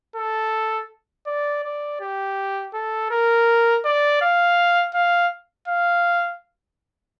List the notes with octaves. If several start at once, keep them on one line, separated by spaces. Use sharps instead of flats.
A4
D5
D5
G4
A4
A#4
D5
F5
F5
F5